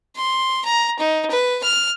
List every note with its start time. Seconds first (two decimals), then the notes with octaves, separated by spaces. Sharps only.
0.16 C6
0.65 A#5
0.99 D#4
1.30 B4
1.63 F6